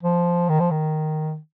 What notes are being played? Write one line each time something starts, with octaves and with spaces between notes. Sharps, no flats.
F3
D#3
F3
D#3